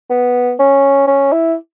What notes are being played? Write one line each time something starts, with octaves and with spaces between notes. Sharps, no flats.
B3
C#4
C#4
E4